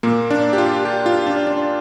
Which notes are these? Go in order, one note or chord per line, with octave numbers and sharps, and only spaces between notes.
A#2 A#3
D4
G4
F4
G4
F4
D4
D4